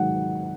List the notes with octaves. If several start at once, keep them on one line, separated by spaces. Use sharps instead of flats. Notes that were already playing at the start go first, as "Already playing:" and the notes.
Already playing: G#2 D#3 F#3 F#5